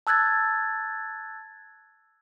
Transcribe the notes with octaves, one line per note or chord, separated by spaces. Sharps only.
A5 E6 F#6 G#6 A6